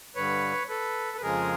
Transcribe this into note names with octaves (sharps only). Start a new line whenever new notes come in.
G2 D3 G3 B4 C#5
A4 B4
B4
F2 C#3 F3 G#3 G#4 A#4